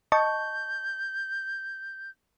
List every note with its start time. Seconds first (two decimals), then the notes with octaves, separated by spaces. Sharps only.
0.12 D#5 A5 C#6 G6